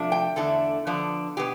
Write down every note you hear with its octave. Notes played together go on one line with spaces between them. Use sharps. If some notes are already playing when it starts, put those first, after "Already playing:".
Already playing: C3 F3 A3 D4
G5
E2 D3 A3 D4 A4
D3 F3 B3 D4
B2 B3 G4